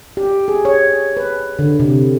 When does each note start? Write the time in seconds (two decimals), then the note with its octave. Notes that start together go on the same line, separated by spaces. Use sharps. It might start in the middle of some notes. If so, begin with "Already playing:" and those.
0.17 G4
0.48 G#4
0.65 C#5
1.17 B4
1.59 D3
1.80 C3